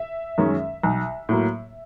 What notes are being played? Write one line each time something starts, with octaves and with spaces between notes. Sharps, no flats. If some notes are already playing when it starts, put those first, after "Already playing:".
Already playing: E5
F#2 D#3 G#3 C#4
B1
A2 F#3 A#3